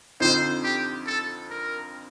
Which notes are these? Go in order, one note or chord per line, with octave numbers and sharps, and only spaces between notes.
F2 D3 F3 C4 D#4 C5
G4
A4
A#4